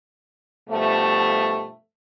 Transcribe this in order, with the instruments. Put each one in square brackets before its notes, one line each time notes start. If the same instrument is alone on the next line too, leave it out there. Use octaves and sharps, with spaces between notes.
[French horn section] G2 B2 F3 A3